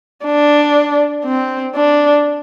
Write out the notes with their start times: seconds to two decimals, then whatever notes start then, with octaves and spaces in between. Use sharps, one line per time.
0.25 D4
1.25 C4
1.75 D4